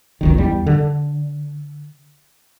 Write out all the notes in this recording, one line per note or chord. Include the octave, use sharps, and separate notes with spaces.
G1 C#2 D#3
E2 G3
D3